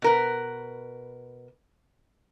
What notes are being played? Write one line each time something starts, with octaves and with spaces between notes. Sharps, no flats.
B2 A#4 B4